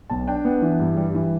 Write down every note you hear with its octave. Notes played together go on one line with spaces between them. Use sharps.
B1 A5
D4 G5
B3
E3
G2
G3
E3